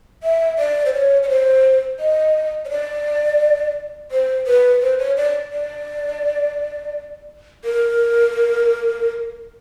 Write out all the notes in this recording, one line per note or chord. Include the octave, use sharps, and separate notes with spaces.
E5
D5
C5
C#5
C#5
C5
D#5
C#5
D5
C5
B4
C5
C#5
D5
D5
A#4